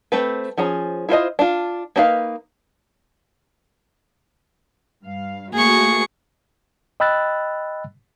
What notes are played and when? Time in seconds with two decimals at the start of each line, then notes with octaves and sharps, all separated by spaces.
0.12 A3 C4 B4
0.58 F3 C#4 G#4 A#5
1.09 E4 F4 C5 D#5
1.39 D4 F4
1.96 A#3 D4 D#4 B4 F5
5.03 G2 F5
5.53 A3 A#3 F#4 G#4 C#6
7.00 D#5 G5 B5 E6 F#6 A6